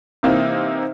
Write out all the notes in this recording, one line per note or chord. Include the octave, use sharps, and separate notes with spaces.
C3 E3 A#3 C4 D#4